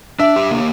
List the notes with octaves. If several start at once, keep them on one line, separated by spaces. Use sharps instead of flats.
D4 E5
G4
A#3